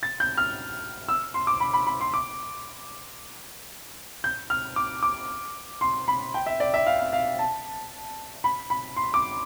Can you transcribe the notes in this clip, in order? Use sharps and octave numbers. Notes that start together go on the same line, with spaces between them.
A6
G6
F6
E6
C6
D6
B5
B5
B5
C6
D6
G6
F6
D6
D6
C6
B5
G5
E5
D5
E5
F5
F5
F5
A5
B5
B5
C6
D6